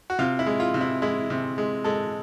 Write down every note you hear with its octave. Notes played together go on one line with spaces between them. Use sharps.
F#4
C3 F4
E4
G#3
F4
C3
E4
G#3 E4
C3
G#3
G#3 A4